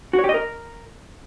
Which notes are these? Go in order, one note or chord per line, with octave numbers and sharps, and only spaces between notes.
F#4
C#5
G4
D#5
A#4